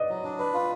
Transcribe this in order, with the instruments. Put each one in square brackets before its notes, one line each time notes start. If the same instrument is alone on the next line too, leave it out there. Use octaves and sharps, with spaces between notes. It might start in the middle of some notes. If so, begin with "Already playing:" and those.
Already playing: [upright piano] B4 D5 D#5
[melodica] F#3
D4
B4
F4